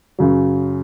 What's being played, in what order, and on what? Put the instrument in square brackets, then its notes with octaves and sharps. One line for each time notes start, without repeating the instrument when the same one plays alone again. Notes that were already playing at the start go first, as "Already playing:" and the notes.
[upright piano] F#2 C#3 F#3